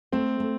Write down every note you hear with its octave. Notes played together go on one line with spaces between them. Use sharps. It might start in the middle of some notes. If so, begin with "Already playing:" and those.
A3 C4
A3